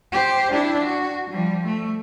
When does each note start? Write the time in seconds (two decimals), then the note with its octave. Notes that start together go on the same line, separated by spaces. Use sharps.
0.12 G4 C5
0.52 D4 E4
0.85 F#4
1.30 F3 G3
1.66 A3